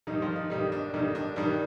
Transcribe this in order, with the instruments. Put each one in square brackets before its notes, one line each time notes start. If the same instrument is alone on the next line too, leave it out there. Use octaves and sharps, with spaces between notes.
[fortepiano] G2 D#3 G3 D#4
F3 F4
D#4
G2 D#3 G3 D#4
D4
G2 D#3 G3 D#4
D4
G2 D#3 G3 D4